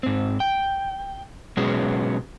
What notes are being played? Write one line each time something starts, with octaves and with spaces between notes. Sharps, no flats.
G#2 C4
G5
B2 F#3 G#3 B3 C#4 G#4